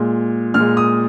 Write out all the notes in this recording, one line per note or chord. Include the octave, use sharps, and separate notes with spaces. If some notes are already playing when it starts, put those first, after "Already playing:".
Already playing: A#2 G#3
A#2 F6
G#3
D#6